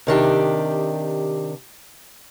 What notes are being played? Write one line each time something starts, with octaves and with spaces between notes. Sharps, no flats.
C3 D#3 D4 G4